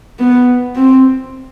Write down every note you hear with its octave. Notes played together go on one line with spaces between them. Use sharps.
B3
C4